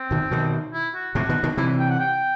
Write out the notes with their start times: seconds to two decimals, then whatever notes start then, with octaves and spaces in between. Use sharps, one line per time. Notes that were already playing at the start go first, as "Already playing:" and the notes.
Already playing: C4
0.11 B2 D#3
0.31 B2 D#3
0.73 E4
0.95 F#4
1.15 A2 C3 F#4
1.29 B2 D#3
1.43 B2 D#3
1.57 C3 E3 E4
1.79 G5
1.89 F#5
1.99 G5